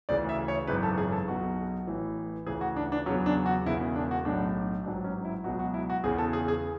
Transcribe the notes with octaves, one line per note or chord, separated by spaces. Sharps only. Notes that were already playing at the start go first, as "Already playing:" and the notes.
D2 C#3 E3 D5
E5
C#5
G#1 F#2 C#3 E3 B4
A4
G#4
A4
B1 B2 F#3 F#4
A1 A2 E3
D2 C#3 E3 G#4
F#4
D4
D4
E2 C#3 F#3 C#4
D4
F#4
E1 E2 C#3 E4
D4
F#4
B1 A2 F#3 D4
A1 G#2 F#3 D4
C#4
E4
C#2 B2 F#3 F#4
F#4
E4
F#4
E2 C#3 E3 G#4
A4
G#4
G#4